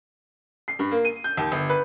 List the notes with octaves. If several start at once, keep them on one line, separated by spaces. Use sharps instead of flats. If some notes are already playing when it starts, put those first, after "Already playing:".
C7
G2
A#3
D#7
G6
D#2
G1
B4